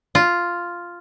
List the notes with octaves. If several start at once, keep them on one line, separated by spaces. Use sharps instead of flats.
F4